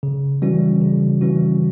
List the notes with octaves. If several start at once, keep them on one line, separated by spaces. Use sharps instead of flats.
C#3
E3 G3 C#4 F#4
C#3
E3 G3 C#4 F#4